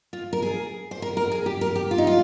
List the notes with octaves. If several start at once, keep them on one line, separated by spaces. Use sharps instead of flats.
F4
A#4
G#4
C5
A#4
A#4
G#4
G4
A#4
G4
F4
D#4
F4